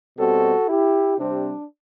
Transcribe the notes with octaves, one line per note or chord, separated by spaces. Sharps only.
B2 G3 C4 F#4 A4
E4 G4
C3 G3 C4 D4